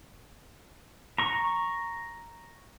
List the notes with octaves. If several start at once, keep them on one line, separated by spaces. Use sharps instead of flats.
A#5 C#6